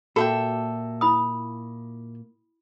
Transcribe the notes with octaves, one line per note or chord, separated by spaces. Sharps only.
A#2 A#3 F#4 A4 E5 G5
E4 B5 D#6